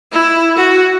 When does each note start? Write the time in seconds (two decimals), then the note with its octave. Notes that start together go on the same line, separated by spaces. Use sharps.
0.13 E4
0.58 F#4